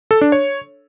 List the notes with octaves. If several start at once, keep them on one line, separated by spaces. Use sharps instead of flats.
A4
D4
C#5